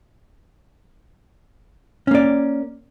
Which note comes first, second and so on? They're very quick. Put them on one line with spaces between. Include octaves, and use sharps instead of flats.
C#4 A#3 D5